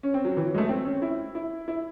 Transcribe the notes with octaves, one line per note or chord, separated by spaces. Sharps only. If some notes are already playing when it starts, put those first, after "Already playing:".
C#4
C4
F#3
E3
F#3
G#3
A3
C4
C#4
E4
E4
E4